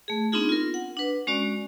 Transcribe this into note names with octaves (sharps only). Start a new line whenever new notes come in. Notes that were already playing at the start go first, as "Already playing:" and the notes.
A3 G#4
B3 C4 D4 D#4 F4 G#4
F4 A#4
F#5
D4 B4
G#3 C#4 F#4 D5